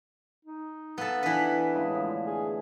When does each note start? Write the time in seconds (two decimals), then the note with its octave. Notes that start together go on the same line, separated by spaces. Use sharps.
0.45 D#4
0.98 B3 A4 F5
1.23 E3 D4 B4
1.74 A2 C#3 G#3
1.94 D3 F3 A3
2.27 G#4